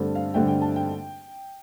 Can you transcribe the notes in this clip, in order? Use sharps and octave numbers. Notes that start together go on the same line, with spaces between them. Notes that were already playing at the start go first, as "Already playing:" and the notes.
Already playing: G2 D3 A3 C4 A4
F5
G2 D3 A3 C4 G5
G5
A5
G5